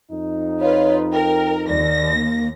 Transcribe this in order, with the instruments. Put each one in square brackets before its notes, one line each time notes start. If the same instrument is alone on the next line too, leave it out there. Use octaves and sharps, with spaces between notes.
[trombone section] F2 D#4
[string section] F4 B4 [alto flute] C#5
[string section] A#4 [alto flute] G5
[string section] D#2 A#6 [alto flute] D5
[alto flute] A#3